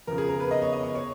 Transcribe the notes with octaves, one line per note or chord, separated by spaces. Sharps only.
F2 C#3 A#4
G#4
A#4
B4
D#5
C#5
D#5
C#5
C#5